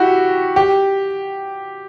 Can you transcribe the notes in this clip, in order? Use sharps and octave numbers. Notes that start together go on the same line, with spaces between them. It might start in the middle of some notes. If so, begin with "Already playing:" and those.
Already playing: E4 F#4 G4
G4